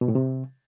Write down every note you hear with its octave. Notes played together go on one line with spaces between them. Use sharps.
B2
A2
C3